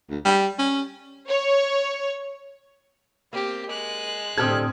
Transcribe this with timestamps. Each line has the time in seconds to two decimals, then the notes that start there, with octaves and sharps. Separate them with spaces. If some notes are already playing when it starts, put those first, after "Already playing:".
0.09 D2
0.25 G3
0.58 C#4
1.28 C#5
3.33 A#3 C4 G4
3.67 G#3 F#6
4.38 A2 D3 C4 G4 A4 D#6 F6 G#6